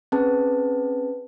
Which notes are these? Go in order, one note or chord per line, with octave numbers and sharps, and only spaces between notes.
C4 C#4 G#4 B4 A5